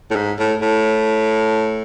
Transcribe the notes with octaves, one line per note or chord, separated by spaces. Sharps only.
A2
G#2
A2
A2